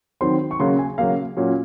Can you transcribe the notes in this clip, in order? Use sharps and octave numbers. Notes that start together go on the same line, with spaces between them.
D#3 F#3 C4 C6
C#6
C#3 F#3 A#3 C6
G#5
C#3 F#3 A#3 F5
A#2 F#3 C#4